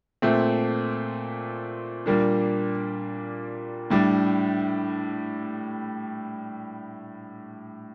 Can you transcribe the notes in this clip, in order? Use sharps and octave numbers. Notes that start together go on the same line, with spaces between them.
A#2 A3 C4
A#2 G3 A#3 D4
A2 G3 D4